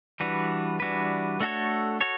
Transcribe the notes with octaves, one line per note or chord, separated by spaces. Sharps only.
E3 G3 D4 F#4 B4
E3 G3 D4 F#4 B4
A3 D4 F#4 A4 C#5
F#4 A4 C#5